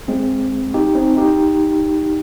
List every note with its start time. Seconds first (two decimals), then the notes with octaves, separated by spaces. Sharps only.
0.08 G#3 C4
0.74 D#4 G4
0.95 C4 D#4
1.17 D#4 G4